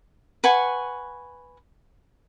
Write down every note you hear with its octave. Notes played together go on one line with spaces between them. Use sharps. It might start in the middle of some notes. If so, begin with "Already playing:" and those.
B4 F#5 G#5 C#6